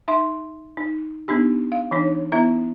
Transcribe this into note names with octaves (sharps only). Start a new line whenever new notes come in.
D#4 E5 C6
D#4
B3 D4 D#4 G4
F5
E3 D4 D#4 C#5
B3 E4 E5 A#5